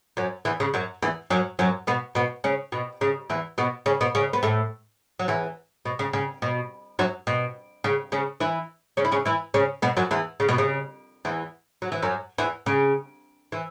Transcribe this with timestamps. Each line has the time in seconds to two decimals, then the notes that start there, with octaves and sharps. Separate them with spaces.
0.17 F#2 F#3
0.45 E2 E3
0.60 C#3
0.74 F#2 F#3
1.02 E2 E3
1.30 F#2 F#3
1.59 F#2 F#3
1.87 B2 B3
2.15 B2 B3
2.44 C#3 C#4
2.72 B2
3.01 C#3
3.30 E2 E3
3.58 B2 B3
3.86 C#3 C#4
4.01 B2 B3
4.15 C#3 C#4
4.33 B3
4.43 A2 A3
5.19 F#3
5.28 E2 E3
5.85 B2
5.99 C#3
6.13 C#3
6.42 B2
6.99 F#2 F#3
7.27 B2
7.84 C#3
8.12 C#3 C#4
8.40 E3 E4
8.97 C#3 C#4
9.05 E4
9.12 C#3 C#4
9.25 E3 E4
9.54 C#3 C#4
9.82 B2 B3
9.97 F#2 F#3
10.11 E2 E3
10.40 C#3
10.49 B2
10.58 C#3
11.25 E2 E3
11.82 F#3
11.92 E3
12.02 F#2 F#3
12.38 E2 E3
12.66 C#3
13.52 E3